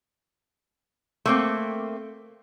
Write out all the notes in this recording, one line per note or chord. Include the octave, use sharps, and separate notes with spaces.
A3 A#3 C4